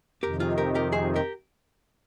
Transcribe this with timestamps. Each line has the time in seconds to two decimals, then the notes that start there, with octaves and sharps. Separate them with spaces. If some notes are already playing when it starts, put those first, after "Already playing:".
0.22 F2 C3 D#3 G4 A#4
0.40 F4 G#4
0.58 G4 A#4
0.75 G4 A#4
0.93 G#4 C5
1.16 G4 A#4